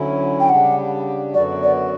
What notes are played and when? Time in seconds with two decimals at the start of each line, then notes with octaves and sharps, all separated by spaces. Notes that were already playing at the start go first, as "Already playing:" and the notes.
Already playing: D2 D3 F#3 C#4 E4
0.40 G5
0.49 C#3 G3 D4 G4 F#5
1.34 F#2 D3 F#3 B3 F#4 D5
1.63 D5